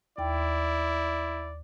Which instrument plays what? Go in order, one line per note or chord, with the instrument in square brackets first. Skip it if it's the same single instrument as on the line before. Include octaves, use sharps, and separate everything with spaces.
[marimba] D#2 G5 [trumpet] E4 [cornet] D5